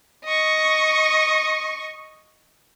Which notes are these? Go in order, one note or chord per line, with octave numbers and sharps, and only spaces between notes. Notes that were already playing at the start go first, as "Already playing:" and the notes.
D#5 C#6